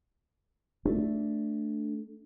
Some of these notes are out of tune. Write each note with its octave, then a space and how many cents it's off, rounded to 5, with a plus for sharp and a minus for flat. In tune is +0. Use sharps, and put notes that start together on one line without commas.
A3 +0 D4 +0